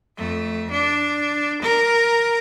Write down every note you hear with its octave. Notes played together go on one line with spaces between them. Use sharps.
F2 A3
D4
A#4